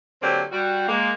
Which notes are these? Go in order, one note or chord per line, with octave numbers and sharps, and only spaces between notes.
D3 F#3 A#3 C4 G4 D5
G3 F#4
G#3 A#3